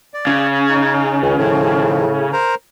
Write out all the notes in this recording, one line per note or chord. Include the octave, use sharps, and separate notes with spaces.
D5
C#3
D#4
C#2 D#3
A2 D#3 F3
A#4 C5 A#5